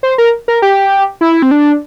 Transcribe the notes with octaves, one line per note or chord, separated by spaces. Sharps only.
C5
A#4
A#4
G4
E4
C4
D4